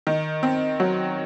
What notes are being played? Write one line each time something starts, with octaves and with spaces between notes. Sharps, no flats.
D#3
C4
F#3